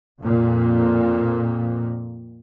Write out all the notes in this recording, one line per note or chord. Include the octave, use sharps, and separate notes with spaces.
F2 A#2